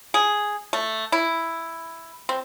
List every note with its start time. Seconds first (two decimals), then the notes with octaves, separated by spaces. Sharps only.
0.14 G#4
0.73 A3
1.12 E4
2.29 C4